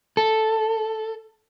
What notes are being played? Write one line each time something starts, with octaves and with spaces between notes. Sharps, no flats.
A4